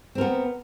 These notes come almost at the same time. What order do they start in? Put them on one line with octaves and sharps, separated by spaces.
C4 A#4 B3